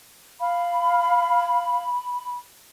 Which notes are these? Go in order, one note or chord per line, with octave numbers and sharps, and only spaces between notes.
F5 B5